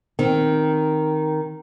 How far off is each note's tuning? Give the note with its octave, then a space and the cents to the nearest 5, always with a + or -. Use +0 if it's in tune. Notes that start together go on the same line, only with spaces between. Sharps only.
D#3 +0 C4 +0